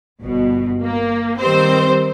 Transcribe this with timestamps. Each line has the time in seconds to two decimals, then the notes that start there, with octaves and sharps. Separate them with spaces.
0.23 G1 B2
0.84 A#3
1.40 D#3 G3 C4 C5